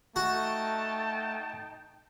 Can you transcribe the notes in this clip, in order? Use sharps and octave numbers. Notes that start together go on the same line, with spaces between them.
A3 D#4 F#4 G5 A5